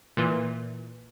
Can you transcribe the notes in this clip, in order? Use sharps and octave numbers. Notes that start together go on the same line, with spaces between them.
A#2 E3